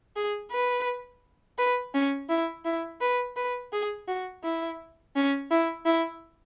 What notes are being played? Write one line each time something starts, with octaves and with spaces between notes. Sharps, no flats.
G#4
B4
B4
C#4
E4
E4
B4
B4
G#4
F#4
E4
C#4
E4
E4